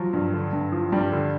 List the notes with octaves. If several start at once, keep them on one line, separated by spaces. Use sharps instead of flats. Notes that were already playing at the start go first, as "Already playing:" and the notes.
Already playing: F3 F#3
G2
D3
G2
F3
G2 G3
D3